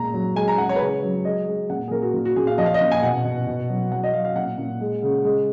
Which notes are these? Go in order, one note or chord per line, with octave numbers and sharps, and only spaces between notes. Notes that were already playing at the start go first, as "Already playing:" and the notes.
Already playing: A#2 G#3 A#5
F#3
G#3 G#5
A#5
G#3 F#5
C#5
B4
C#3 C#5
F#3
G#3 D#5
G#3
A#2 F#5
G#4
A#2 A#4
F#4
A#2
F#4
A#2 G#4
F5
F3 D#5
F5
D#5
A#2
G#5
B2 F#5
B2
B2
F#3
F#3 F#5
D#5
F#3 F5
F5
A#2 F#5
A#2
G#3
C#3
G#3